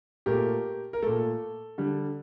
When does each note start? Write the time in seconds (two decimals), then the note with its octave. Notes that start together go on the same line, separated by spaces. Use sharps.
0.26 A#2 A3 G4 A#4
0.93 A#4
1.02 A#2 A3 A4
1.78 D3 G3